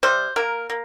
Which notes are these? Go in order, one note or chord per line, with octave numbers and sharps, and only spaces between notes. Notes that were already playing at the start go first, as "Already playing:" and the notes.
C3 G3 C5
A#3 A#4
A#3